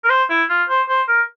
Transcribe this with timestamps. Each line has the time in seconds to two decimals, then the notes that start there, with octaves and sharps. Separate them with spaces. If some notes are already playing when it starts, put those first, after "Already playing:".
0.04 A#4
0.10 C5
0.30 E4
0.50 F4
0.69 C5
0.89 C5
1.08 A#4